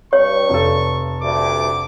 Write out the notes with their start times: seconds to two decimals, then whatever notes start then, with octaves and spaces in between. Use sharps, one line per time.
0.13 G2 C#5 C#6
0.49 F1 A4
1.22 D2 G2 D6